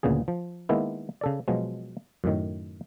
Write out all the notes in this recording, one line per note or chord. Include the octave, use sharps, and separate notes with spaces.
D2 A#2 C#3 B3 G#4
F3
D#3 G#3 A#3 B3 E4
C#3 A4 D5
B2 F3 F#3 G#3
F#2 A2 D#3